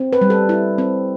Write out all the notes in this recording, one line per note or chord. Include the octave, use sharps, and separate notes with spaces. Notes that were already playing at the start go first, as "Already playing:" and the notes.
Already playing: C4
B4
G3
A4
E4
C4